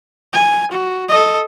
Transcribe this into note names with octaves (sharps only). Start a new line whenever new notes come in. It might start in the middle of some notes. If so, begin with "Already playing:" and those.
G#5
F#4
A4 D#5